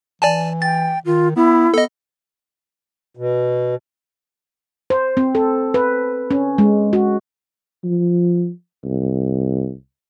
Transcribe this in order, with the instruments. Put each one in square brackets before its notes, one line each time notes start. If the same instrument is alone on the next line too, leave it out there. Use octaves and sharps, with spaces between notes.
[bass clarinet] E3 [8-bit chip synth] D5 G#5 A5
[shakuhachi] G5 [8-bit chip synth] A6
[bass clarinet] D#3 [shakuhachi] F4
[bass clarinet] B3 [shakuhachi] E4
[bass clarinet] B3 [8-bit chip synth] A4 D#5
[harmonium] B2
[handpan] C5
C4
A4
B4
C#4
G#3
F#4
[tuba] F3
C2